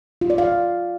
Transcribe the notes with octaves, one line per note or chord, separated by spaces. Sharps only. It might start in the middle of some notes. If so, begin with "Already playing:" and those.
F4
D5
F5